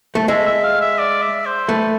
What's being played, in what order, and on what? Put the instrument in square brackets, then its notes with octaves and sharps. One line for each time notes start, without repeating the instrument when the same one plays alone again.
[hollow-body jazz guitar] A3
[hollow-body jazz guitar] G#3 [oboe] E5
[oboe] E5
F5
E5
D5
E5
C5
[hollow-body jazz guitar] A3 [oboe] B4